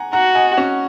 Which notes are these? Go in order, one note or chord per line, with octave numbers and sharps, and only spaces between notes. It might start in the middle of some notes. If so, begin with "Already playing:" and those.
Already playing: F#5 G#5 A#5
F#4 F#5 A#5
D#5 G#5
C#4 F#4